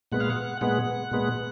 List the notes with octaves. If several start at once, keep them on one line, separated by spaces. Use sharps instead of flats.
A#2 G#3 B3 F#5
F5
F#5
A#2 G#3 B3 F#5
A#2 G#3 B3